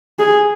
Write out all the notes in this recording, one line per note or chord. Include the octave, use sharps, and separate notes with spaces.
G#4